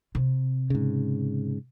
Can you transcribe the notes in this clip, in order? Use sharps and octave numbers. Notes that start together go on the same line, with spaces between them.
C3
G#2 C#3